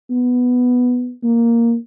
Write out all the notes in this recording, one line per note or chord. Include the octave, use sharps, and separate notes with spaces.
B3
A#3